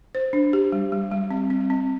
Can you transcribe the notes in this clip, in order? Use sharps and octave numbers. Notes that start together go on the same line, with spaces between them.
C5
D4
G4
G3
G3
G3
C4
C4
C4